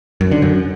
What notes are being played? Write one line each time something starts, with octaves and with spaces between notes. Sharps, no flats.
F#2
D3
F#2